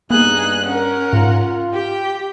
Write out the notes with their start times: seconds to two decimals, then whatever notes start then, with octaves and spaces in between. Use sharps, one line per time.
0.11 G2 A#3 B3 D#4 G#4 F#6
0.66 C#4 A#4 F#5
1.13 G#2 F4
1.73 G4 G5